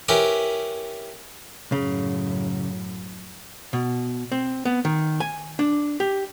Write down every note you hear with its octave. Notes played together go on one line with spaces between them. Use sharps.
C#4 E4 G4 A#4 B4
F#2 A2 C#3
B2
C4
B3
D#3
G#5
D4
G4